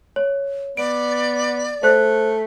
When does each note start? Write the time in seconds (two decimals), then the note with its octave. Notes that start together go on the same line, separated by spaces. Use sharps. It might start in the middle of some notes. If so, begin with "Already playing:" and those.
0.16 C#5
0.77 B3 D5 D7
1.83 A3 C5 F#6